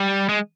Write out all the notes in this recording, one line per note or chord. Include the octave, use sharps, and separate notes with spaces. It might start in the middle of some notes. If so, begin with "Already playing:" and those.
Already playing: G3
G#3